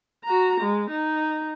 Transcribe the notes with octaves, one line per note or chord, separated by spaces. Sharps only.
F#4 A#5
G#3
D#4